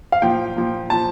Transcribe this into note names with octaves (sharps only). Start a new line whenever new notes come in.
F5
A#2 F3 G5
A#2 F3
A#2 F3 A5